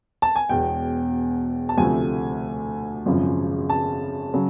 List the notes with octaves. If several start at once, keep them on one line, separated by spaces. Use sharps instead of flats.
A5
G#5
E1 E2 B2 G5
A5
D2 C3 F3 A3 C4 G#5
G#1 F#2 C#3 F3
A5
C#3 F#3